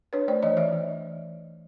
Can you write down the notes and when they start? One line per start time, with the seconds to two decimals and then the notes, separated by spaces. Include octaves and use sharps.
0.13 D4 B4 C#5
0.28 A3 C5 D5
0.43 E3 C#5 D#5
0.57 E3 D5 E5
0.73 E3